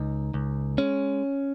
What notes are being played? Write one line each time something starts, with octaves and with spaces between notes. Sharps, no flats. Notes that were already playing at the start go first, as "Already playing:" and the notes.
Already playing: C#2 D#4
C#2
G#3 C#4